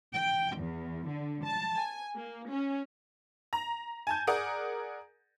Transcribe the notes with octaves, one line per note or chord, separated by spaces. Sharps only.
G5
E2
D3
A5
G#5
A#3
C#4
A#5
G#5 A5 G6
G#4 A#4 D5 F#5 D#6